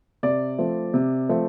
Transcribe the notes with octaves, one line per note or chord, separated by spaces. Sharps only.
C3 D5
F3 A3 C4
C3
F3 A3 C4